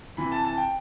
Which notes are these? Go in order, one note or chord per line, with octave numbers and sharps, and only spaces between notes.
C3 E3 B5
A5
A5
G5